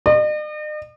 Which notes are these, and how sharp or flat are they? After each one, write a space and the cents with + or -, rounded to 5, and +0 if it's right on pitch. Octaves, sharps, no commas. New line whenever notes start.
D#5 -45